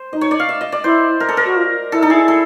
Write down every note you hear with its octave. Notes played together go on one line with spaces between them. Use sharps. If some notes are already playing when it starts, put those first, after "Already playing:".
Already playing: C5
D#4 D#5
C#5
D5
F5
E5
D#5
D5
E4 C5
A#4
A4
A#4
F#4
F4
E4 A4
D#4 A4
E4 G#4
A4